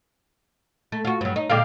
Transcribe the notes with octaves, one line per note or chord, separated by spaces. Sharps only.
A3
F4 F#4
G2 F#3
D#4
A#2 D3 G#3 F5 G5 D6